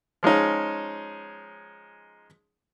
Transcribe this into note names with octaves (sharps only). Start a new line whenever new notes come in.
F3 G#3 C#4 D#4